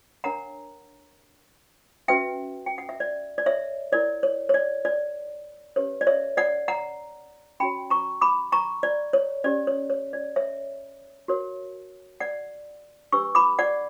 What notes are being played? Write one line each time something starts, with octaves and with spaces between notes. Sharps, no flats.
D4 A#4 C#5 F#5 A#5
C#4 F#4 B4 E5 G5
G5
F#5
E5
D5
D5
C#5 E5
E4 A#4 C#5 D5
C#5
C#5
D5
D5
C#4 G4 B4 C#5
D5
C#5 E5
D5 F#5
F#5 A#5
C#4 F#4 C#5 G5 B5
A#5 C#6
B5 D6
A#5 C#6
D5
C#5
C#4 G4 C#5 D5
C#5
C#5
D5
C#5 E5
F#4 A#4 C#5
D5 F#5
D4 G4 B4 C#6 E6
B5 D6
D5 F#5